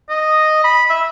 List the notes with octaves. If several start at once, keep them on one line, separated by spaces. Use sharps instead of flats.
D#5
B5
E5